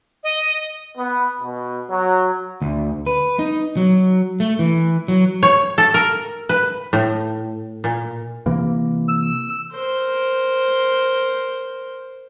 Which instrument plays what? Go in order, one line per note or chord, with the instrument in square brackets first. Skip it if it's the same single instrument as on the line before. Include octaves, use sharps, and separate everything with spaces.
[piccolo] D#5
[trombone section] B3
B2
F#3
[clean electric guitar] D2
B4
D#4
F#3
A3
E3
F#3
[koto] C#5
A4
A#4
B4
A2
A#2
[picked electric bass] C3 E3 A#3
[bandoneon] E6
[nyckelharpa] A#4 C5